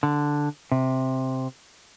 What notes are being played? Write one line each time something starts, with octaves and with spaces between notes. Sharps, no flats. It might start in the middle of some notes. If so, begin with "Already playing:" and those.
D3
C3